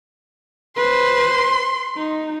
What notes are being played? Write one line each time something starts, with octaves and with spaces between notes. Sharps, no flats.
B4 C5 C6
D#4